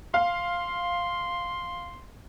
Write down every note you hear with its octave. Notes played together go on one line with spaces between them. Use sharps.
F5 C6